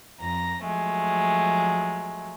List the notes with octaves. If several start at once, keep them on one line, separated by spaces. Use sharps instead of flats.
F2 A#5 A#6
F3 F#3 G#3 A3